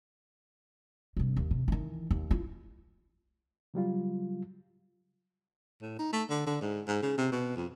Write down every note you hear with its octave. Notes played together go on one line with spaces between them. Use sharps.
G2 C3
D#2
C3
D#3 E3
D#2
E4 F4
C#3 F#3 G3 F4
A2
D#4
A3
D3
D3
G#2
G#2
C#3
C3
B2
F2